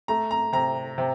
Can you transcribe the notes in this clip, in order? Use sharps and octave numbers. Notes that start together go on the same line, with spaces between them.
A3 A#5
A#5
C3 A#5
C3